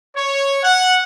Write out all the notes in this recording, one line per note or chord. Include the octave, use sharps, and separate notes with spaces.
C#5
F#5